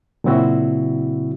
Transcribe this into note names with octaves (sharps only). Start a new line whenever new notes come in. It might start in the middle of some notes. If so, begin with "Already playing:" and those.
A#2 C#3 F#3 C4 E4 F#4